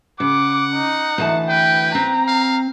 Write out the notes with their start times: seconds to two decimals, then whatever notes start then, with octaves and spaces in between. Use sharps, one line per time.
0.20 C#3 F#5 D6
0.75 D#4
1.18 D2 E3 A5
1.50 B4 G5
1.95 C4 A#5
2.28 F5